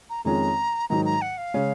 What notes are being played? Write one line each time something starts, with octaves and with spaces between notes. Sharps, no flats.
A#5
F2 D#3 G#3 C#4 F4 A#5
G#2 D#3 F#3 A#5
A#5
F#5
F5
C#3 G#3 C#4